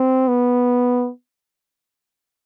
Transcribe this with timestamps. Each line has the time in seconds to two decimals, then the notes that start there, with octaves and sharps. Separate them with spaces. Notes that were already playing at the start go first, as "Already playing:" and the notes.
Already playing: C4
0.28 B3